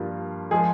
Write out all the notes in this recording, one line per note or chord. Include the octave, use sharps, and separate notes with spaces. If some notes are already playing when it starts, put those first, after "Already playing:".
Already playing: G2 F3 A#3 F4
F3 G#3 G#4